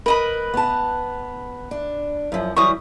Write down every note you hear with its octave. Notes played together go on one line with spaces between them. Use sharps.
A#4 B4 D#5 B5
B3 A5
D4
F#2 F3
E3 F#3 G3 C#6 D#6